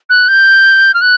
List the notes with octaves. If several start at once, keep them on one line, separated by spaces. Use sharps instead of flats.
F#6
G6
F6
F#6